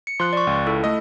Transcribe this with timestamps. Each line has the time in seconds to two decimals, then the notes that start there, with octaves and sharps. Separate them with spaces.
0.07 C#7
0.20 F3 C6 F#6
0.33 D5 C#6
0.47 C#2
0.67 E4 A4
0.84 A3 D#5